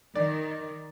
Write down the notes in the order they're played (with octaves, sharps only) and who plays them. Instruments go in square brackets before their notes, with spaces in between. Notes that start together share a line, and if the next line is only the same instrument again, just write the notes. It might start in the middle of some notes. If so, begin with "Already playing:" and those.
[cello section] D#3 [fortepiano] D5